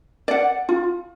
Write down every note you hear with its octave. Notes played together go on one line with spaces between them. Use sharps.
D5 F#5
F4